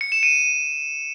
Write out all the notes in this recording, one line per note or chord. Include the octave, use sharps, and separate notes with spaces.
C#7
E7
D#7